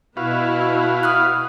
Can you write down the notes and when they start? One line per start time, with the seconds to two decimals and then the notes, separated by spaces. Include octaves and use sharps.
0.17 B2 B3 E4 F#4 B4 F5
1.03 D#6 F6 F#6